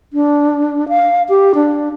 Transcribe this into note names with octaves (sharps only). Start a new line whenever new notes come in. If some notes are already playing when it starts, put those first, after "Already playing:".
D4
F5
G4
D4